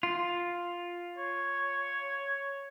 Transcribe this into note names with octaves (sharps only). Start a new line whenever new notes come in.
F4
C#5